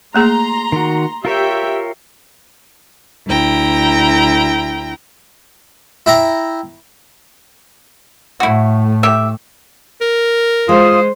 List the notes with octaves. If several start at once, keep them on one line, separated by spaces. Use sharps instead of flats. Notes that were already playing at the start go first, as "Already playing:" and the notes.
A3 A#3 G#4 A#5 C6
D#3 F#4
F4 G4 A#4 C#5 E5 G5
D2 E4 G5 A#5
E4 G5 A#5
A2 A3 E4 F#4
G4 E5
A#4
G#3 F4 C5 D#6